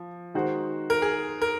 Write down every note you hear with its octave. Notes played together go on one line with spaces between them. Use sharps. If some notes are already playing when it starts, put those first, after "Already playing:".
Already playing: F3
D#3 G#3 D#4 F#4 C5
A#4
G#4
A#4